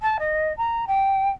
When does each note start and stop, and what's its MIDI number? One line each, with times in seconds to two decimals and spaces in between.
0.01 0.17 81
0.19 0.53 75
0.57 0.85 82
0.87 1.30 79